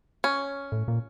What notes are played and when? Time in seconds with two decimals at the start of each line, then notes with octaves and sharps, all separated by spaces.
0.24 C#4
0.72 A2
0.88 A#2